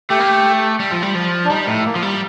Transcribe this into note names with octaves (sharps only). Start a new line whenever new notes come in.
A3 G4
A#3
A3
G3
F3
G3
F3
D4
G3 D#4
A2
A#3
F3
G3